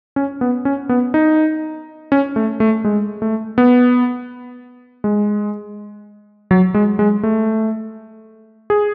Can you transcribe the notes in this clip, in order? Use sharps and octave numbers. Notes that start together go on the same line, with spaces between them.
C#4
B3
C#4
B3
D#4
C#4
A3
A3
G#3
A3
B3
G#3
F#3
G#3
G#3
A3
G#4